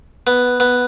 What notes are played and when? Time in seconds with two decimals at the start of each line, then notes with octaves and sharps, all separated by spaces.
0.27 B3
0.60 B3